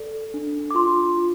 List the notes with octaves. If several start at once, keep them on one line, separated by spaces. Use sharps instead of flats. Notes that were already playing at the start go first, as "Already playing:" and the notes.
Already playing: A4 D5
D4
D6
F4 C6
F4